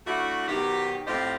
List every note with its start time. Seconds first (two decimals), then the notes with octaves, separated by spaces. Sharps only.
0.06 A3 D4 E4 F#4
0.48 B2 D#3 F#3 G4
1.07 A2 C4 F4 G4 C5 D#5